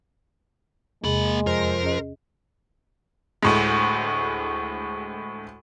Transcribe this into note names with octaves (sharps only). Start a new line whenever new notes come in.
E2 C3 G#3 A#3 G#4 B5
F2 A#4 C5
C#4 G#4 D#5
D2 A2 G#3